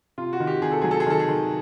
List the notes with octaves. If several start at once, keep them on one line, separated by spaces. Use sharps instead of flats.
C3 F4
F#4
D#3
G4
C3 G#4
A4
F#3 G#4
A4
G#4
D#3 A4
G#4
D#3